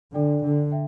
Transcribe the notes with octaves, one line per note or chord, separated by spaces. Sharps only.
D3 D4 A4 D5 G5
D3
E5 G5